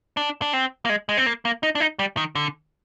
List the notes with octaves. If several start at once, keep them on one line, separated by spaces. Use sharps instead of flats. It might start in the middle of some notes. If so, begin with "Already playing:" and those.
D4
D4
C4
A#3
G#3
G#3
C4
A#3
A#3
D#4
D4
D#4
G3
D#3
D3